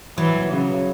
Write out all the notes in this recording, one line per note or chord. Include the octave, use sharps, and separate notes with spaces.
E3 F#3
C#3